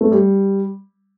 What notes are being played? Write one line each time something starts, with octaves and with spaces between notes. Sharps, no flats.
A3
G3